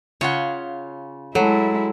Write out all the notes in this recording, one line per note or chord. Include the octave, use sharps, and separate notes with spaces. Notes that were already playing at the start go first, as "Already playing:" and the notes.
C#3 F4 C#5 F#5
F#3 G#3 E4 A4